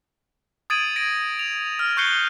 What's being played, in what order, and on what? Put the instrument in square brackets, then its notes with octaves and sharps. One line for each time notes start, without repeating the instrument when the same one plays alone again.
[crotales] D#6 G#6 A6 D7 D#7 F#7
A#6 D7
F7
F6
C#6 F#6 G6 C7 C#7 G7